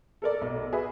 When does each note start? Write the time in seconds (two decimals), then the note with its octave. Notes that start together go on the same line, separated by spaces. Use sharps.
0.22 A4 A#4 D5
0.41 B1
0.73 F#4 G#4 B4 E5